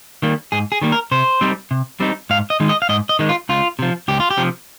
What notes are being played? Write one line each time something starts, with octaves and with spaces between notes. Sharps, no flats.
D#3 G3 A#3
G#2 G#4
G#4
D#3 G3 A#3
A#4
C3 C5
G3 C4 D#4
C3
G3 C4 D#4
G#2 F5
D#5
D#3 G#3 D#4
D#5
F5
G#2 D#5
D#5
D#3 G#3 D#4
F4
C#2 F4
C3 F3
C#2 G4
F4
G4
C3 F3